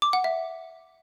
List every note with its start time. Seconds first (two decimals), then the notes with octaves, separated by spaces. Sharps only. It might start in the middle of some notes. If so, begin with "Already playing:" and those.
0.02 D6
0.13 F#5
0.24 E5